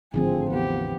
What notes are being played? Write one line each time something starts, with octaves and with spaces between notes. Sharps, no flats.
G#1 A2 D3 F3 C4 G#4
A1 E2 A2 B3 G4